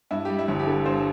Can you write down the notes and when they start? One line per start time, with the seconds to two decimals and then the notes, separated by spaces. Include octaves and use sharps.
0.11 G2 E4
0.25 G3 G4
0.39 E4
0.48 G1
0.59 G4
0.67 D3 A4
0.85 G2 C5